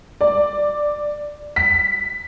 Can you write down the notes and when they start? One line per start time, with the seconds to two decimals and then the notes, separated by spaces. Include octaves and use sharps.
0.21 D5
1.56 B6